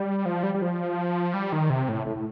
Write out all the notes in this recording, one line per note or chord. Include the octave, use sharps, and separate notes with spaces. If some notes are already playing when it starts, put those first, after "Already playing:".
Already playing: G3
F3
G3
G3
F3
G3
D#3
C3
A2
A2
A2